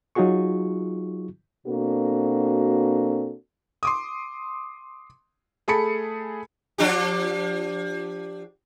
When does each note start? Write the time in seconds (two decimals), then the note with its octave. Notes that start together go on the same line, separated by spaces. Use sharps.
0.15 F#3 D#4 F4 F#4 G#4 C#6
1.66 B2 A#3 C4 D4 F#4 A4
3.83 C6 D6 D#6
5.68 A3 G#4 A5 B5 C#7
6.78 F3 D4 G4